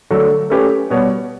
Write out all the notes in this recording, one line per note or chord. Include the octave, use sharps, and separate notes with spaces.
D3 F#3 A3 D4 A4
A3 C#4 G4 B4
B2 G3 B3 F#4 C#5